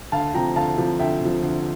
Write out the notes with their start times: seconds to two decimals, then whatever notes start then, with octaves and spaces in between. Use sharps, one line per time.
0.12 D2 F5 A5
0.34 C3 F3 G5 A#5
0.56 D2 F5 A5
0.78 C3 F3
0.99 D2 E5 G5
1.21 C3 F3
1.43 D2